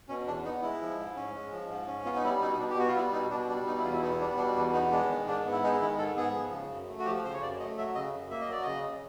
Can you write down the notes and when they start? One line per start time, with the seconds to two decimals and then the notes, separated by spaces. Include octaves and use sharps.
0.09 B2 C#4
0.27 E2 D4
0.44 B3 D#4
0.62 G#3 E4
0.81 F3
0.98 G#2
1.16 C#4
1.34 G#3
1.52 F3
1.69 G#2
1.87 C#4
2.05 B3 F4
2.16 D#4
2.24 G3 E4
2.41 B2 D#4
2.53 D#4
2.59 B2 D4
2.70 G4
2.78 B3 F#4
2.88 F4
2.95 G3 E4
3.12 B2 D#4
3.30 B2 D4
3.48 G3 D4
3.66 B2 D#4
3.78 E4
3.84 E2 F4
3.93 E4
4.02 B3 D#4
4.20 G3 D4
4.37 B2 D4
4.56 E2 D4
4.73 B3 D#4
4.91 G#3 D4
5.09 D#3
5.27 G#2 D4
5.45 B3
5.52 E4
5.63 G#3 D#4
5.80 D#3 E4
5.98 G#2 A4
6.16 B3 G#4
6.34 F3
6.52 C#3
6.70 F#2
6.88 A3
6.99 F#4
7.05 F3 G4
7.24 C#3 C5
7.33 C#5
7.41 F#2 D5
7.59 A3 D#5
7.77 F#3 E5
7.95 C#3 D#5
8.13 F#2
8.30 A#3 E5
8.41 D#5
8.48 F#3 D5
8.63 C#3 D#5